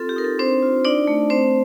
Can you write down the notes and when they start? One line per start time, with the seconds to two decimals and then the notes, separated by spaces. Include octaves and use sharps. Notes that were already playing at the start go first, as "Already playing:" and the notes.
Already playing: C4 F4 A4
0.09 G4
0.16 D#4 A#4
0.24 A4
0.39 C4 D4 C5
0.62 F4
0.85 D4 D#4 D5
1.07 A3
1.30 C4 C5